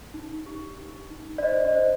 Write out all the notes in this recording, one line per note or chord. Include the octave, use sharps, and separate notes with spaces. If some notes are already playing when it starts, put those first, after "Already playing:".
D#4
G4
G4
D#4
D5
C5 D#5
D#5
D5
C5